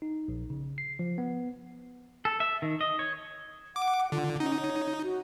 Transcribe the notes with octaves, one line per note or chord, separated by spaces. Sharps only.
D#4
A#1
C#3
C7
F3
B3
A4
E5
D#3
D#5
C#5
F#5 D6
D3 F4
C#4 D#4
C#5
F#4